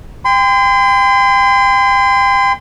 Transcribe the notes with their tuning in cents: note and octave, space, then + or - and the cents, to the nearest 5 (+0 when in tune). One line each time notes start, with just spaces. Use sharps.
G5 +30 C6 -35